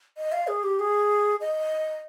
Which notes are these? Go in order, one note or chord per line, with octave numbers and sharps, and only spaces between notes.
D#5
F5
G#4
G4
G#4
D#5